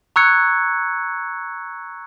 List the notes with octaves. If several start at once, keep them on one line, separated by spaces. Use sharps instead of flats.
A#5 C#6 E6 F#6 G#6 C#7